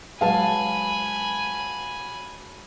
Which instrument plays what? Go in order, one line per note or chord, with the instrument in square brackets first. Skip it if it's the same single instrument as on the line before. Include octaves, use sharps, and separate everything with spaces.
[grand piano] F#3 G#3 B4 [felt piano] F5 A5 [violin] G#5 B5